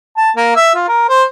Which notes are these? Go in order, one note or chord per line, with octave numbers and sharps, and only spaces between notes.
A5
A#3
E5
F4
A#4
C5